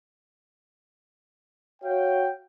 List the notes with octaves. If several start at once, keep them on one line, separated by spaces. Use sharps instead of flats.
F#4 C#5 F5 G5